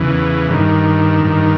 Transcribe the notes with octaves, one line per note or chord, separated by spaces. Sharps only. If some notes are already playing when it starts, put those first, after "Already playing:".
Already playing: E2 C#3 E3
G2 D#3
G2 D#3